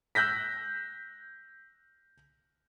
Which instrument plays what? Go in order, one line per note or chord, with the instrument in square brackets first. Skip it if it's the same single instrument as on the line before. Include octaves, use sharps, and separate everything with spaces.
[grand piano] E6 F#6 G6 A#6 B6